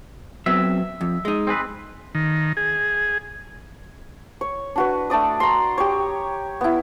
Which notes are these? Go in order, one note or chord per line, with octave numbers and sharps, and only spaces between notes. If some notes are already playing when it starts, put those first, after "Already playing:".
F#3 B3 C4 E5
F2
G#3 D#4
C4 G#4 B4
D#3
G#4
C#5
D4 F#4 B4
A3 D4 D5 D#6
A#5 C6
G4 C#5
B3 E4